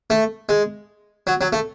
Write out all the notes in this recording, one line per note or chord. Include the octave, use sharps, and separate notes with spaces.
A3
G#3
F#3
F#3
A3